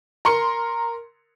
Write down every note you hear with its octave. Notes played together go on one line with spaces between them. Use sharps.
A#4 C6 C#7